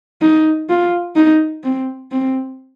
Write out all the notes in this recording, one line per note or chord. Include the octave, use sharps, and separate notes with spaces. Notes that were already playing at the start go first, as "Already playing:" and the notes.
D#4
F4
D#4
C4
C4